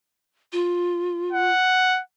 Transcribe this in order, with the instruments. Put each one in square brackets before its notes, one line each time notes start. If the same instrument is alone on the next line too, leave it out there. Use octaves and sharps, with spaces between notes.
[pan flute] F4
[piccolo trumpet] F#5